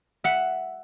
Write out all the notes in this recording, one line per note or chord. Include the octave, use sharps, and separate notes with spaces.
E5 F#5